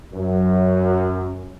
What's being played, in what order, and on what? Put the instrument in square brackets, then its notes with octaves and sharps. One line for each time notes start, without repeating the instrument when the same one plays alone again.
[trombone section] F#2